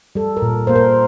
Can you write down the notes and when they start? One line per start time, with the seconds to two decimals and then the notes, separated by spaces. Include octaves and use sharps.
0.15 G3 A4
0.37 A#4
0.42 A#2
0.67 A#3 C5
0.76 A#4